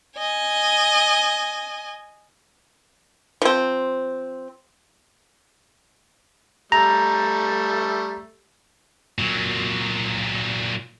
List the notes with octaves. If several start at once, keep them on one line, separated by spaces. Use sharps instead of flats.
D#5 G#5
F3 C4
G3 A3 A#5
A#2 F#3